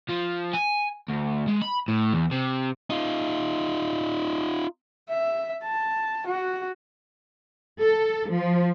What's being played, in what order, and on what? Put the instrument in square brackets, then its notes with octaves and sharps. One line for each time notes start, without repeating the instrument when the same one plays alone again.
[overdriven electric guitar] F3
G#5
D2
G#3
B5
A2
E2
C3
[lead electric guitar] D#4 F4
[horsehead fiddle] E5
A5
F#4
[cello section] A4
F3